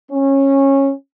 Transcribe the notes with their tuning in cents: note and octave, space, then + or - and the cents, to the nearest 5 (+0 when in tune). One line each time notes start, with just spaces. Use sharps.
C#4 -20